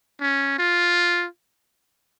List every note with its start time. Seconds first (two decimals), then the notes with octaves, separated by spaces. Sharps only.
0.21 C#4
0.59 F4